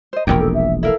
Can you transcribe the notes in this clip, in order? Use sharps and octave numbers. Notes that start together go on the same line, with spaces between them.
C5 D#5
E1 A#1 E2 G4 A#4 G5
A4
E5
E4 A4 A#4 F5